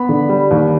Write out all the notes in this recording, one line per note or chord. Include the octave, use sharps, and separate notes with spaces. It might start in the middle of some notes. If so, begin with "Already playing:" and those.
Already playing: B3 B5
D3
G3
D#2